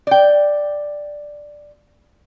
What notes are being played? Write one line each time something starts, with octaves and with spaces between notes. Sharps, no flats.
D5 G5